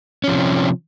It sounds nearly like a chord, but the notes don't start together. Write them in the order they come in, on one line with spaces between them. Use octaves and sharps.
C#4 F3 C3